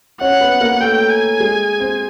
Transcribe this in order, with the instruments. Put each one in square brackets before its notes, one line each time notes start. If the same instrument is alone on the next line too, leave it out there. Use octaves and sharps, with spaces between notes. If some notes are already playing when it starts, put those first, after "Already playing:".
[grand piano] C#4 C#5 [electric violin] F#5
[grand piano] B3 B4
A#3 A#4
[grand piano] A3 A4 [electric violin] G5
[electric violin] G#5
[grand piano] G#3 G#4
C4 C5